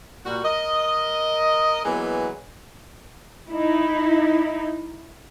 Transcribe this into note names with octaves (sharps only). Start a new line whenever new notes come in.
A#2 G3 F#4
A#4 D#5
E3 F#3 G#3 A#3 B3
D#4 E4